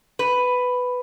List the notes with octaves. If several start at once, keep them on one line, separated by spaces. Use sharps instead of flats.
B4